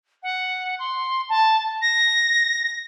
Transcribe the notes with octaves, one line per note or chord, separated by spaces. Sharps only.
F#5
C6
A5
A#6